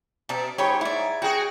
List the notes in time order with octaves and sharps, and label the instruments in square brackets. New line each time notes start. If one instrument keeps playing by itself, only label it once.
[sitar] B2 [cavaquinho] D5 A5
[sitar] G#2 C#5 [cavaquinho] G4 B5
[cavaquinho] E4 D5
[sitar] F#4 G#4 [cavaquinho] G5